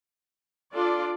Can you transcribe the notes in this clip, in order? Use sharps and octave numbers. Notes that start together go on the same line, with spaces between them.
D4 F4 A4 D5